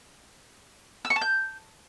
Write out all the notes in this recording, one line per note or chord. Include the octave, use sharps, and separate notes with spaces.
E6
C#6
A5
G6